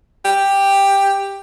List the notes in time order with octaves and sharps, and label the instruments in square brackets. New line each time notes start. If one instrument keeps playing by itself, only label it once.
[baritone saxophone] G4